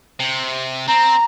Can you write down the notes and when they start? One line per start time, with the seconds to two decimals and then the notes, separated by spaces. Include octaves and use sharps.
0.20 C3
0.88 C4 A#5